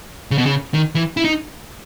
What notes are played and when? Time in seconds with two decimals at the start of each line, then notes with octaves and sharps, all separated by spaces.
0.31 C#3
0.38 B2
0.46 C#3
0.74 D#3
0.95 E3
1.17 E4
1.25 D#4